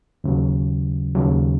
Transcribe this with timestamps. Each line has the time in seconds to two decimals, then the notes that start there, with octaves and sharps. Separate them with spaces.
0.24 D#2 C#3 F#3
1.15 D#2 C#3 F#3